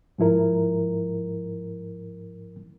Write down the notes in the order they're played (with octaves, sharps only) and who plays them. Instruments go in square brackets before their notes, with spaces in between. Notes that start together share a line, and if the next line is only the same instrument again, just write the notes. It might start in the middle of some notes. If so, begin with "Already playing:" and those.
[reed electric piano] G#2 F3 E4 A#4